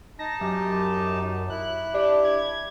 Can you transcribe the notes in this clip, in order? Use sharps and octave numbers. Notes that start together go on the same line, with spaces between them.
D#4 A5 A#6
F#2 G4
E4 F#6
D4 G4
G#6